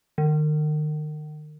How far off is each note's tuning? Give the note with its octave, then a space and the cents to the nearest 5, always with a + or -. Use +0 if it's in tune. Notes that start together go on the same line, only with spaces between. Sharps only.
D#3 -35